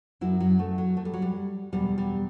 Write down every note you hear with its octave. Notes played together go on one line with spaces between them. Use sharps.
F#2 F#3 E4
F#3
A3
F#3
A3
G3
F#3
G3
E2 B2 F#3 G3
G3